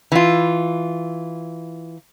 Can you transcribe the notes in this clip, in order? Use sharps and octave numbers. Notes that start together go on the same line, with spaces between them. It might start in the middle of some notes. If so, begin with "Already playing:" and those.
E3 F4